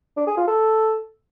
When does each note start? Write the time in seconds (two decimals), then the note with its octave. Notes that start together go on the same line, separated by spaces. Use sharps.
0.17 D4
0.27 G#4
0.37 F4
0.47 A4